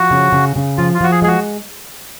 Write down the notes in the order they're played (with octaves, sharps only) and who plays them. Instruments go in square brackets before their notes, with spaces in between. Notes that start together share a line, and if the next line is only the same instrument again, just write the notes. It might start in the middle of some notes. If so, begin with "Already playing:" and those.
Already playing: [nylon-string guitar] F3 [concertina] F#4
[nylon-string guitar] C#3
C#3
C#3
[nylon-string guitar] F3 [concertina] F4
[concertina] F4
[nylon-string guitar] F3 [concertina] F#4
[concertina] G#4
[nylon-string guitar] G#3 [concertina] G#4
[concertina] F#4